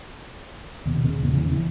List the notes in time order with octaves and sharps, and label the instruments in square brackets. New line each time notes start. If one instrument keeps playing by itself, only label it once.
[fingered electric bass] D#2 B2
C#3
D#1 E2 A#2
C#3 E3
E2 E3